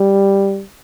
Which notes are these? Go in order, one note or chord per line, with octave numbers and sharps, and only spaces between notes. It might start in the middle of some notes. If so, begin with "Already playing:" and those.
Already playing: G3